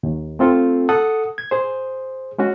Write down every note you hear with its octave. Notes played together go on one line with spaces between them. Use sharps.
D#2
A3 C4 F4 A4
A4 F#5 D#6
G#6
G#4 C5
G#3 C#4 F#4